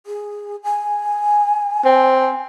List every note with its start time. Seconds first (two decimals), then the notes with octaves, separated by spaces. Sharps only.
0.06 G#4
0.64 G#5
1.85 C4